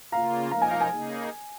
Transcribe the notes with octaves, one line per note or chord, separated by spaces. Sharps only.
C#3 A#3 F4 F5 A#5
F3 A#3 D#4 A#4 F5 A#5
G#5
F5
G#5
C#3 A#3 D#4 G#4